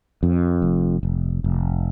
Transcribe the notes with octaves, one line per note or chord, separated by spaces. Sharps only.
F2
F1
F1
F1